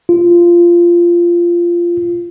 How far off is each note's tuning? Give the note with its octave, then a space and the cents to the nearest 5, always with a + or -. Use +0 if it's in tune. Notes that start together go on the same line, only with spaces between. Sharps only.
F4 -15